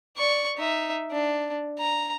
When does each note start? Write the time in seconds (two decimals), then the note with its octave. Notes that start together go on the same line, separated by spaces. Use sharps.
0.17 D5 C#6
0.57 D#4 E5
1.11 D4
1.79 A#5